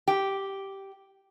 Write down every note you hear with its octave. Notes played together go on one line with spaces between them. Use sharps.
G4